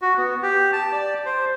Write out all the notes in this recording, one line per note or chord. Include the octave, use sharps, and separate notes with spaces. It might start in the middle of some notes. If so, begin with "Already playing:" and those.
F#4
B3
G4
A5
D5
C5